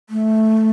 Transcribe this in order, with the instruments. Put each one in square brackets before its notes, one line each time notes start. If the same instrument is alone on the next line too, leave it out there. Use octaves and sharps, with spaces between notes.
[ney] A3